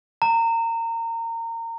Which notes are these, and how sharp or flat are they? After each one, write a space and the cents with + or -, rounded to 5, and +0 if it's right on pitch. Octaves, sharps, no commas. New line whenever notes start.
A#5 -25